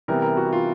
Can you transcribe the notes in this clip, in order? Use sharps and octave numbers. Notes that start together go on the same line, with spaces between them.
C3 E3 G3 B3 A#4
A#4
F#4
F4